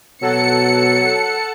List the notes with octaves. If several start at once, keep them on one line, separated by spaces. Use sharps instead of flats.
B2 F#3 A4 F#5 A5 C#7